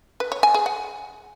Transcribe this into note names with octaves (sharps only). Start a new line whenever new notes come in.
B4
C#5
G#5
G#4
F#5